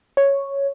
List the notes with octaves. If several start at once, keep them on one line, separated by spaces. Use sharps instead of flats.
C#5